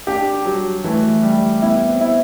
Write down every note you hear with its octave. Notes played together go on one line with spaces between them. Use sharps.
D4 G4
F#3 G3
E3 A3
G3
B3 E4
C4
E4